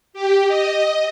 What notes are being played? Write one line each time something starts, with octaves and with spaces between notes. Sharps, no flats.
G4
D#5